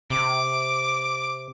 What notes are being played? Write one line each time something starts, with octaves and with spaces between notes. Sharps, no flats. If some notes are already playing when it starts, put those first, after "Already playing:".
C3 D6